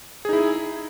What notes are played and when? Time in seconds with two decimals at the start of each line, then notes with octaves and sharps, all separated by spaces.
0.25 G#4
0.29 D#4
0.33 E4